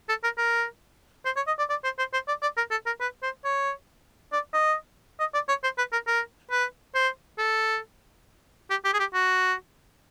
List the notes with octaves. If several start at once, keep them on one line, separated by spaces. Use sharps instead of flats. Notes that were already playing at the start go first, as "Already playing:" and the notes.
A4
A#4
A#4
C5
C#5
D#5
D5
D5
C5
C5
C5
D5
D5
A#4
A4
A#4
B4
C5
C#5
D5
D#5
D#5
D5
C#5
C5
B4
A#4
A#4
B4
C5
A4
G4
G4
G#4
G4
F#4